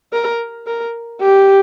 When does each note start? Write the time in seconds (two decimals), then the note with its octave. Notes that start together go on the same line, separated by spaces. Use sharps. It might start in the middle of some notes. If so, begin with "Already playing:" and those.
0.13 A#4
0.67 A#4
1.21 G4